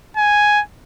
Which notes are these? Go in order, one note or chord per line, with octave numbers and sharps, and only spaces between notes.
G#5